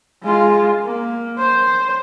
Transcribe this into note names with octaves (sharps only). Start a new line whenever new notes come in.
G#3 F4
A#3
C5